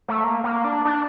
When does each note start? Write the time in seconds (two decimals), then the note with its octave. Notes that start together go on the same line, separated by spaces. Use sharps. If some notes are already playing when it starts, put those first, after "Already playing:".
0.08 A3
0.24 A#3
0.44 A#3
0.64 D4
0.85 D4